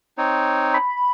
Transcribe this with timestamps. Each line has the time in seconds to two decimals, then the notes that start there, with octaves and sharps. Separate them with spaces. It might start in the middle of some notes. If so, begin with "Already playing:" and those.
0.18 C4 D#4 C#5
0.74 B5